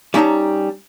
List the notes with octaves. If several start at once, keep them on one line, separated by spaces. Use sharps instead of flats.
G3 C#4 D#4 F5 A5 A#5